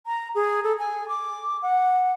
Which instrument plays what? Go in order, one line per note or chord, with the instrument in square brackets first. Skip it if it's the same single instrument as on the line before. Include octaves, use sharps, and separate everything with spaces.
[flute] A#5
G#4
A4
G#5
D6
F#5